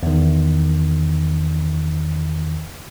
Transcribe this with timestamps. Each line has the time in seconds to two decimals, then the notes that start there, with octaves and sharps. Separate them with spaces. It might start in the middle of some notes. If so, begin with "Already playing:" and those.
0.03 E2 D#3